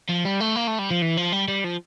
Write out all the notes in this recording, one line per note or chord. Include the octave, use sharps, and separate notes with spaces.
F3
G3
A3
A#3
A3
G3
F3
E3
F3
G3
G3
F3